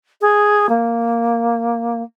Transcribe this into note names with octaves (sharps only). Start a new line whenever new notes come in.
G#4
A#3